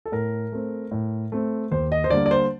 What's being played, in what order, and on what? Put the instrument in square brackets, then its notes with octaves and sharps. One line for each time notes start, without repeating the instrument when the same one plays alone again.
[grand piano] A4
A2 A#4
A3 C4
A2
A3 C4
D#2 C5
D#5
C5
D3 G3 A#3 D5
D5
C5